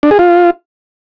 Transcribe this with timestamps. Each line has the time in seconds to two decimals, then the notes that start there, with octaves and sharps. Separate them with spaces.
0.03 D4
0.11 G#4
0.19 F4